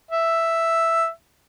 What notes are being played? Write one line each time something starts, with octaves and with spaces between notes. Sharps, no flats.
E5